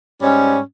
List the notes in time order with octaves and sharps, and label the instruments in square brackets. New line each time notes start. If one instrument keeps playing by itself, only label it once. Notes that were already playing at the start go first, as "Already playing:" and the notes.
[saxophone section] G#2 G3 C#4